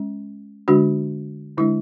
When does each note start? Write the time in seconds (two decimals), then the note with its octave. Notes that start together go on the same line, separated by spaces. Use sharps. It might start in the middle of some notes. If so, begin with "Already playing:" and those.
Already playing: G#3 C#4
0.68 D3 G#3 D4 F#4
1.58 D3 G#3 D4 E4